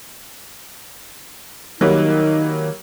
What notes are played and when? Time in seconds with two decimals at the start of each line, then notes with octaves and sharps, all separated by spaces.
1.81 D#3 F#3 G3 A#3 D#4